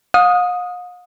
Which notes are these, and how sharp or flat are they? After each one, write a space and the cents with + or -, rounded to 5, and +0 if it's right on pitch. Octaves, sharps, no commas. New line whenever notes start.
F5 +45 D#6 +0